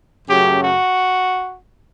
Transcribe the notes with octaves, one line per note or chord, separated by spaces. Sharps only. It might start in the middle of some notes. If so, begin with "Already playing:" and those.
F#2 C#3 F#3 A3 G4
F#4